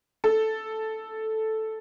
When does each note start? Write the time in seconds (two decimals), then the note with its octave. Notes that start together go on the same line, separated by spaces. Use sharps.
0.24 A4